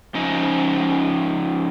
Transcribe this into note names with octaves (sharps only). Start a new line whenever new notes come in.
F3 C#4 D#4 D#5